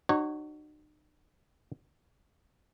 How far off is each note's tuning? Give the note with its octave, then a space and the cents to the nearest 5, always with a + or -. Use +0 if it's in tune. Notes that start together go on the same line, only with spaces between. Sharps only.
D#4 -45 F#4 +20 C#5 -30